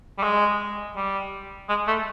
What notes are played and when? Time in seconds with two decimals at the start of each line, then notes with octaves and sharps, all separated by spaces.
0.18 G3
0.23 G#3
0.96 G3
1.69 G#3
1.87 A3